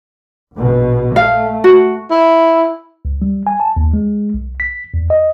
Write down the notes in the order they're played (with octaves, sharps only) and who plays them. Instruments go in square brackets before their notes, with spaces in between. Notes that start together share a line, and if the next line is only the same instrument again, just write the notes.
[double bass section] A#1 B2
[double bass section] A3 [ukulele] F5
[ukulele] F#4
[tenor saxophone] E4
[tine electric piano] C#2
G3
G#5
A5
D#2
G#3
B1
B6
E2
D#5